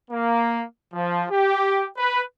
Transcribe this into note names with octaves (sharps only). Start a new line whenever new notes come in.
A#3
F3
G4
B4